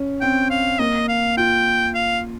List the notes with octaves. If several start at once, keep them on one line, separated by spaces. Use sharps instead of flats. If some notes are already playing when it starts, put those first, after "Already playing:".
Already playing: C#4
C4 G5
F5
A#3 D#5
F5
F4 G5
F5